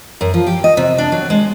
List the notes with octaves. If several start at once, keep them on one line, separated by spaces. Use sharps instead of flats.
F#2
F3
G4
D#5
C3
D4
F#3
G#3